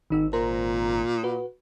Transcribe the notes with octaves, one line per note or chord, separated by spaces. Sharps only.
G#1 D#3 D#4 E6
A#2 A#4 C5 A#5
F#4 B4